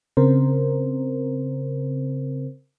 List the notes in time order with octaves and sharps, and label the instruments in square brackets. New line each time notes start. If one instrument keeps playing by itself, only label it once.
[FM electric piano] C#3 C4 A#4 C5